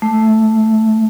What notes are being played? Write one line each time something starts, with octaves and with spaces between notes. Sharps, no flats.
A3